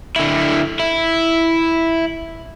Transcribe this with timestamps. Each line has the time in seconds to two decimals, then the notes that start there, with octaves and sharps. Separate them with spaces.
0.16 D3 E4
0.80 E4